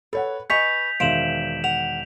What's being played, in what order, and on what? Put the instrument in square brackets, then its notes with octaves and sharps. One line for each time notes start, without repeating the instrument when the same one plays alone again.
[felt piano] A4 C#5 F#5 [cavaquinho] B4
[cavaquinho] B4 C#6 [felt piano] D#5 G#5 [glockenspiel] G6 B6 F7
[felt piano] E1 D#3 E5 [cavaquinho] C5 F5 [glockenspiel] D7 E7 F#7
[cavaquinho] F#5 [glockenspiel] F7